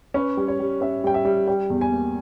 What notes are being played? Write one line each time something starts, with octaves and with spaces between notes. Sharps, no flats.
C#4 B4
G3
C#5
G3
C#4 E5
G3 G5
E5
G3
G3 G5
E2
G#5
A#3